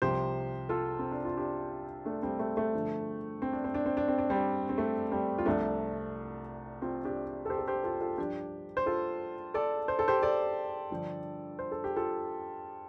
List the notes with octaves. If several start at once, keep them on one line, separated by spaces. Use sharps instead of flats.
C2 C3 F3 G4 C5
F4 A4
C4
D4
F4
D4 G4
A3 D4
G3 C4
A3
A3
G2 D3 F3
C4
D4
C4
D4
C4
D4
C4
D4
G3 C4
C4
A3
G3 C4
F4
C2 C3 F3 A3 D4
C4 F4
D4 G4
A4
G4 C5
A4
G4 C5
F4 A4
F4 A4
G2 F3 D4 G4
C5
F4 A4
A4 D5
C5
A4
G4 C5
A4 D5
G2 D3 F3
C5
A4
G4
F4 A4